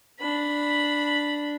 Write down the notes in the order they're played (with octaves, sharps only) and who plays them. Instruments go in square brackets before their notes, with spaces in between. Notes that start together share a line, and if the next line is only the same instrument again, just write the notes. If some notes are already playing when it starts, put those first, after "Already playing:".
[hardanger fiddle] D4 B5